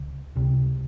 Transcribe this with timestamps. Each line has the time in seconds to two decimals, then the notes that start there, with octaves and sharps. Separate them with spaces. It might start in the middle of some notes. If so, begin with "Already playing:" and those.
Already playing: C#2 C#3
0.36 C#2 C3